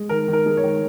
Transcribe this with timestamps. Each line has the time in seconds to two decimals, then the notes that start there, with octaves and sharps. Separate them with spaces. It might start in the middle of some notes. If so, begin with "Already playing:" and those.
Already playing: G#3
0.09 D#3 A#4
0.28 D#3
0.33 A#4
0.46 G#3
0.57 C#5
0.64 D#3